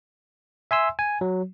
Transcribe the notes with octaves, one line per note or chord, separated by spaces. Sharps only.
E5 G#5 C6 E6
G#5
F#3